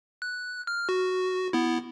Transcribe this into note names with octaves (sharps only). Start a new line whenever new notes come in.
F#6
F6
F#4
B3 E4